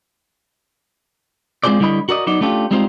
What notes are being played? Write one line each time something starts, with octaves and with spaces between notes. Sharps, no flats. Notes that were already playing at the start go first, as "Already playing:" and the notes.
G#3 C4 F4 G#4 C5 D5
D3 G3 E4 C#5 D#5 B5
F#4 A#4 D5 D#5
F#3 B3 D#4 D5
A3 C#4 D4 F4 G4
G3 G#3 C4 D#4 F4 C5